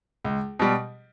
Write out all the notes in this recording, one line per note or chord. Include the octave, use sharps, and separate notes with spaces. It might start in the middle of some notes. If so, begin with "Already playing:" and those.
C#2
B2 G3